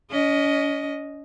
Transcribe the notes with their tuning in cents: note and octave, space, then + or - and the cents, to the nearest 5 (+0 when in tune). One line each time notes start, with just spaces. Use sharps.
C#4 +35 D#5 +0